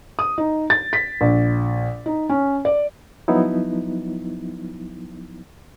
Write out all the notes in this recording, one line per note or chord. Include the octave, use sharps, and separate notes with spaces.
D#6
D#4
A6
B6
A#1
D#4
C#4
D5
F3 F#3 B3 D#4 E4